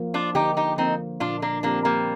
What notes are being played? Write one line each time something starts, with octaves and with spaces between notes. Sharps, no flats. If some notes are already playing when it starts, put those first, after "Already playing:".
Already playing: F3 A#3
D4 F4
D3 D#4 G4
D#4 G4
F3 A#3 C4 D#4
A#2 D4 F4
A#3 D4
F3 A#3 C4 D4 G4 A#4
G3 A#3